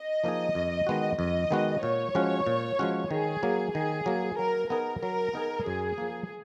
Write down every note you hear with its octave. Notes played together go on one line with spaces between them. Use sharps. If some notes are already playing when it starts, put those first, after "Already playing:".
Already playing: D#5
F3 A#3 D#4 G#4
F2
D#3 G#3 B3 F#4
F2 D#5
D#3 G#3 B3 F#4
A#2 C#5
F3 G#3 C#4 F#4
A#2
F3 G#3 C#4 F#4
D#3 G#4
F#3 A#3
D#3 G#4
F#3 A#3
F#3 A#4
B3 D#4 G#4 A#4 D#5
F#3 A#4
B3 D#4 G#4 D#5
F#2 G#4
F3 A#3